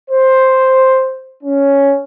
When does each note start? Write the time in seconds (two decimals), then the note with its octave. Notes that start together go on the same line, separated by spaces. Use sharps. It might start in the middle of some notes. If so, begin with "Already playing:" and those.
0.11 C5
1.44 C#4